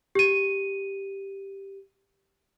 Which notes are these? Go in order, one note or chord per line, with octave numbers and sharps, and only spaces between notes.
G4 D#7